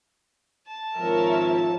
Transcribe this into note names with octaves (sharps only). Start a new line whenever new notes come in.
A5
G#1 F3 A#4 C#5 E5